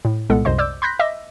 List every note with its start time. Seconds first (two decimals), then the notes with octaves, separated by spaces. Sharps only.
0.05 A2
0.30 C2 A#2 G#3 B3 A4 F#5
0.45 C2 F#2 C3 C5 D#5 C6
0.58 D5 D6 E6 G6
0.82 B5 C6 F#6 G6 A#6 B6
0.99 D#5 E5 D6 E6 A#6